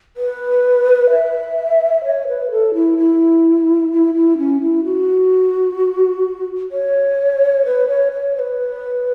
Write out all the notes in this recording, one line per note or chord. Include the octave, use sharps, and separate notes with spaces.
B4
E5
C#5
B4
A4
E4
E4
E4
E4
C#4
E4
F#4
C#5
B4
C#5
C#5
C#5
B4